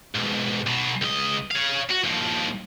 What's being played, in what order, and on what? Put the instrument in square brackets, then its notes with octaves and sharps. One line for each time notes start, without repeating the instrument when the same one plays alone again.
[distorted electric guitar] B1 G#2
B1 B2
C#2 D#5
C#5 F5
F#4
D#2 F3